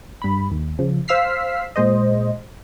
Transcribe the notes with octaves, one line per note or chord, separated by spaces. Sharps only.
G2 B5
D#2
C#3 F3
C5 F5 E6 F6 B6 C7
A#2 G#3 C5 D#5